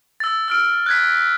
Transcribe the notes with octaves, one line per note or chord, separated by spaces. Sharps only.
E6 A6
E6 F6 D7
F#6 G#6 B6